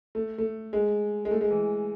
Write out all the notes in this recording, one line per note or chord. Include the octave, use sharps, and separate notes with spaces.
A3
A3
G#3
G#3
A3
G#3
E3